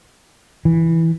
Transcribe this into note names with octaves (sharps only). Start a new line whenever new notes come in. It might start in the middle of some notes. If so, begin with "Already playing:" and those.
E3